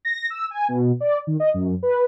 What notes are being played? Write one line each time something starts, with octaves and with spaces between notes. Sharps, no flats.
A#6
E6
G#5
B2
D5
D#3
D#5
F#2
B4